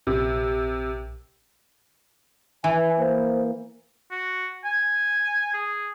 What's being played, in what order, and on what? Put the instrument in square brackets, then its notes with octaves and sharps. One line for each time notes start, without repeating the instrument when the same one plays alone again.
[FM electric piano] A#1 [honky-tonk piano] C3
[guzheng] E3 [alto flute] G#5
[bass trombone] A#3 [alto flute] C5
[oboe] F#4
G#5
G#4